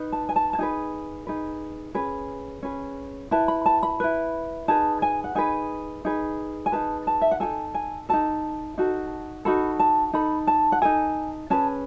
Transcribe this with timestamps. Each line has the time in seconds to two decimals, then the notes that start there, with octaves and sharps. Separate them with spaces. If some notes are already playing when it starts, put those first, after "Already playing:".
Already playing: D#4 B4
0.12 A5
0.29 G#5
0.36 A5
0.53 A5
0.59 D#4 G#4 B4 G#5
1.27 D#4 G#4 B4
1.95 C#4 G#4 B4
2.63 C#4 G#4 B4
3.31 E4 B4 A5
3.48 B5
3.66 A5
3.83 B5
4.00 E4 B4
4.68 D#4 G#4 B4 A5
5.02 G#5
5.24 F#5
5.35 D#4 G#4 B4 G#5
6.05 D#4 G#4 B4
6.66 G#5
6.72 D#4 G#4 B4 A5
7.07 A5
7.21 E5
7.31 F#5
7.40 D#4 F#4 A4 G#5
7.74 G#5
8.09 F#4 A4 A5
8.13 D#4
8.78 D#4 F#4 A4
9.45 D#4 F#4 A4 B5
9.80 A5
10.13 D#4 A4 B5
10.47 A5
10.72 F#5
10.82 D#4 A4 G#5
11.50 C#4 G#4 B4 A5